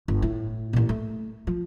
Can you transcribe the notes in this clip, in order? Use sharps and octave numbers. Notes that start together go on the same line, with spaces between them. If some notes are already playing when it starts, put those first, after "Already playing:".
G1
A2
A1 A#2
A3
F3